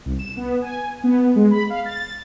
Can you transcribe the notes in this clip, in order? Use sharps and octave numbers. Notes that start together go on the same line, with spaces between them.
C2
E7
B3
G#5
B3
G#3
B5
F5
A6